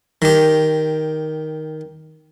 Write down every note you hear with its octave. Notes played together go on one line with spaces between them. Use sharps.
D#3 G4